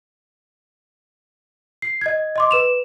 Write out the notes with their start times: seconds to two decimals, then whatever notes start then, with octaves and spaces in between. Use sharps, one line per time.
1.82 C7
2.01 D#5 G#6
2.36 D#5 C6 D6
2.51 B4 E7 F7